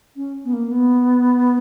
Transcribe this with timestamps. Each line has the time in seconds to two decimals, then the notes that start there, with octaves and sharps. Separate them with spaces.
0.16 C#4
0.45 B3
0.53 A#3
0.71 B3